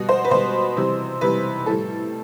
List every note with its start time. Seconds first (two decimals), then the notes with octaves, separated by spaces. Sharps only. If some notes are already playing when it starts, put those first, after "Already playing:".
Already playing: B2 G3 F#4
0.09 C5
0.24 B4
0.31 B2 G3 C5
0.76 C3 E3 G3
1.21 C3 E3 G3 B4
1.66 A2 G3 A4